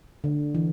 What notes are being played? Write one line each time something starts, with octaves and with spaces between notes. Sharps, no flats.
D3
E3